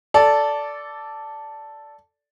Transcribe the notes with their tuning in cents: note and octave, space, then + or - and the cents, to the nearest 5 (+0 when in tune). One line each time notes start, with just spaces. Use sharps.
A4 +0 D5 -10